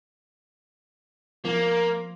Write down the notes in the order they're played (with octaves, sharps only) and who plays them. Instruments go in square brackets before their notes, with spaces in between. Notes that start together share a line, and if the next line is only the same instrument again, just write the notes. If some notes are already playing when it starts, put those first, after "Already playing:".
[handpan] F3 F4 [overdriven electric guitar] A#3